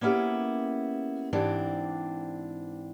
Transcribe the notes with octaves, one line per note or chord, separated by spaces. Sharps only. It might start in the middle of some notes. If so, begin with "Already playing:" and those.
A#3 B3 C#4 E4 G4 G#4
G#2 E3 C4 D4 G4